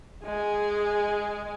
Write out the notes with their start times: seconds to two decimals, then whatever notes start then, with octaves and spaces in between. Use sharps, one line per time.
0.25 G#3 G#4